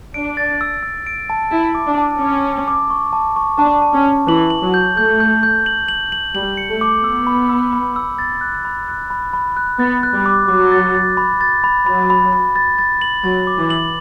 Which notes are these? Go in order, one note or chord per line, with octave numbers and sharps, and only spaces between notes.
D4 D7
A6
E6
E6
D7
A5
E4 A5
D6
D4
A5
C#4 D6
D6
D6
C#6
A5
C#6
D4 A5
A5
C#4
A5
E3 F#7
F#7
F#3
G6
A3 G6
G6
G6
F#7
F#7
F#7
G3 F#7
C#7
A3
D6
B3 E6
B5
E6
B5
E6
A6
F#6
B5
F#6
B5
B5
F#6
B3 A6
F#6
G3
D6
F#3 D6
A6
A6
B5
A6
B5
F#3 B5
B5
B5
A6
A6
F#7
F#3 A6
D6
E3
F#7